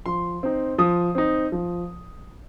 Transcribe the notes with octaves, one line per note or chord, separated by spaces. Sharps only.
F3 C6
C4 D#4
F3 D#6
C4 D#4
F3